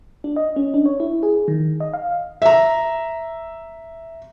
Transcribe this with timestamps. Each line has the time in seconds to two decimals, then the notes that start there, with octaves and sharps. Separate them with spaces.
0.24 D4
0.36 D#5
0.56 C#4
0.74 D4
0.86 C#5
1.00 E4
1.23 G#4
1.48 D#3
1.80 D#5
1.93 F5
2.42 E5 A#5